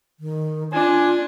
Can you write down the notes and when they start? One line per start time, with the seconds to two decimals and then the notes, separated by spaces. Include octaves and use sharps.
0.20 D#3
0.73 D4 F4 G#5